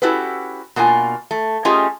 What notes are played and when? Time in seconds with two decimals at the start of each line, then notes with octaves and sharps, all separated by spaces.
0.02 C#4 E4 F#4 G4 A4 B4
0.76 B2 A#3 D4 F4 G#5
1.31 A3
1.65 A3 C#4 F4 G4 G#4 D#5